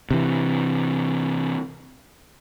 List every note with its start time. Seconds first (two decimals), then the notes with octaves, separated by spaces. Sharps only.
0.11 C3 E3